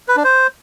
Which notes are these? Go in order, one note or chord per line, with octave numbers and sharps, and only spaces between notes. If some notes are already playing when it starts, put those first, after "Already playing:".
B4
D4
C5